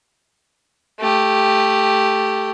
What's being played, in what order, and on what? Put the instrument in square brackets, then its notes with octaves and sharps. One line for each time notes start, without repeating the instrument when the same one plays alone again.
[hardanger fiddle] A3 G4